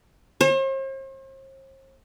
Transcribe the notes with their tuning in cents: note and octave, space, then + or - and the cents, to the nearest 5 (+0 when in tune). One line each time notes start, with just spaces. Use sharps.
C5 +45